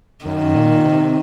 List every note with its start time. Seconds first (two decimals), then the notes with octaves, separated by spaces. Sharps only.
0.25 F#2 D#3
0.55 A#2
0.85 C3